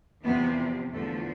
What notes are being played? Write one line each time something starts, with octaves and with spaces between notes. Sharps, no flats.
E2 C3 F3 B3
E2 D3 F3 A3